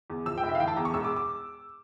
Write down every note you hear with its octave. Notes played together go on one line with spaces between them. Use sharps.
E2
F3 E6
G5
F1
E5
F5
E3 G5
A5
E2 A#5
C#6
E1 E6
D6
D6